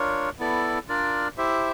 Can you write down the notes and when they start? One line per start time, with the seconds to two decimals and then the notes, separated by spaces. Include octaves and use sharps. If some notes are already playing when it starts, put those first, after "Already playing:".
Already playing: D4 F4 A#4 C#5
0.39 B3 E4 A4 D5
0.89 D4 F4 A#4 D5
1.38 E4 G4 C5 E5